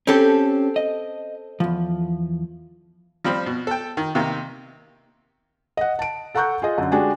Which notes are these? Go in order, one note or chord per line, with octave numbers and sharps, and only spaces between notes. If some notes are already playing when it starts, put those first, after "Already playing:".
C4 C#4 G4 A4
D#5
E2 F3
F3 G3 C4 B5
B2
A4 G5
D#3
C3 D#3 A#3
D#5 F#5
A5 D7
A4 F#5 A#5 C#6 F#6 G6
F4 G#4 D#5
F#2 D3
G#3 D4 F#4 G4 G5 G#5